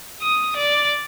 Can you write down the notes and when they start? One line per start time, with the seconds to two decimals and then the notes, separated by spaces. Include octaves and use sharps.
0.22 D#6
0.57 D5